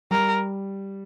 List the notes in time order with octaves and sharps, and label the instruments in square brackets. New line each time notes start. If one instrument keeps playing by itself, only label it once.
[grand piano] G3 [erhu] A#4